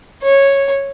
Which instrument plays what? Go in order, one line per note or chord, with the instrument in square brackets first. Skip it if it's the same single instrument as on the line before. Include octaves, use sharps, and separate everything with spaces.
[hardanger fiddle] C#5